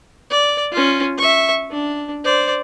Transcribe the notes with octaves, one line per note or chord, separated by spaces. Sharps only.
D5
C#4 F4
E5 C#6
D4
C5 D5